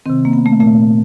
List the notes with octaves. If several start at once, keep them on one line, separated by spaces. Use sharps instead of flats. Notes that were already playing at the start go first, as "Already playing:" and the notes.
C3 D#3 C4
A#3
B3
A3
A#2 A3